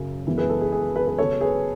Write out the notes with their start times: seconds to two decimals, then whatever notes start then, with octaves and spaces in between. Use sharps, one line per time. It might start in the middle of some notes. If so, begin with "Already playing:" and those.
Already playing: F#2 C#3
0.27 F#2 E3 G#3 B3
0.38 G#4 B4
0.49 A4
0.61 G#4
0.72 G#4
0.95 G#4 B4
1.07 G#4 B4
1.18 C#3 F#3 B3 A4 C#5
1.41 G#4 B4